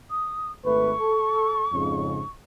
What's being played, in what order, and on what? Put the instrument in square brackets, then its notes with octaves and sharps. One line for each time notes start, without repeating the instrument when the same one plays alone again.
[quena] D#6
[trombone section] G#1 A3 B4 [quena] C#6
[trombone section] A4
F2 G#2 C#3